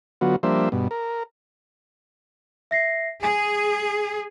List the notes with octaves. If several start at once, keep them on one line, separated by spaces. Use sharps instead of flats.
D3 F#3 B3 F4 F#4
F3 G3 A#3 D4 C5 E5
G2 B2
A#4
E5 A#6 C7
G#4 G#5